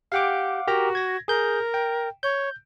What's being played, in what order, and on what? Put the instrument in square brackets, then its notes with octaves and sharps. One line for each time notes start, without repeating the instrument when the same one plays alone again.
[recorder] G4 [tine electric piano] F5 F#5 D6
[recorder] F#4 [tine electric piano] G4 A#4 A#5
[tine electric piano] G#6 A#6
[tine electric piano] G#4 G6 [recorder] A#4
[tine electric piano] G5
[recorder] C#5 [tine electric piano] G6